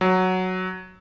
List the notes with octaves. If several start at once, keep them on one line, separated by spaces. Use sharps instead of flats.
F#3